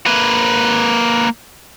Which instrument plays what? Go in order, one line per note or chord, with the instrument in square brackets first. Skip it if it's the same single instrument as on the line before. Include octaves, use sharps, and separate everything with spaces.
[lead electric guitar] A#3 B4